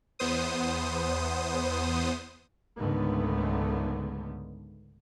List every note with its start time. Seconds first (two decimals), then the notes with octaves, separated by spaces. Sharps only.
0.19 E2 B3 C5 D#6
2.78 C#2 G#2 D3 D#3 A3 B3